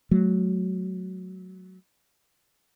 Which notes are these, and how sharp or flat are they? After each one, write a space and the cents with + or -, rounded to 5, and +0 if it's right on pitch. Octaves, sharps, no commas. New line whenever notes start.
F#3 +0 A3 -30